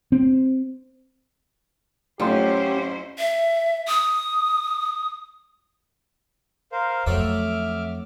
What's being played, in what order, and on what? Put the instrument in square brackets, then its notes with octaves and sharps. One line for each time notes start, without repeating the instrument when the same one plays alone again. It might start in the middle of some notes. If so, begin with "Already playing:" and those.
[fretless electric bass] C4
[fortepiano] A1 F4 C6 [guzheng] F#3 [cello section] C#4 E4 C5 [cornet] G4
[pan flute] E5
D#6
[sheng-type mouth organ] A#4 C5 F5
[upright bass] F2 [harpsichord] F#3 A3 A4 [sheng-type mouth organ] E5 D6 F6